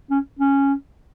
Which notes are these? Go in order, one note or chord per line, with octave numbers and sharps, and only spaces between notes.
C#4
C#4